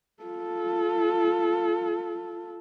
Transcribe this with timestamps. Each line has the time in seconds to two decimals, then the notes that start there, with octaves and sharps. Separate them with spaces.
0.23 F4 A4